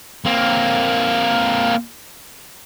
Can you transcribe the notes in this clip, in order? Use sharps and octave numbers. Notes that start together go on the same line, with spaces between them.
A#3 C4